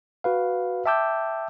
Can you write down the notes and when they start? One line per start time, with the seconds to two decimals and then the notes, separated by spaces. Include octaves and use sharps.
0.24 F#4 B4 F5
0.86 E5 G5 A5 D6 E6 G6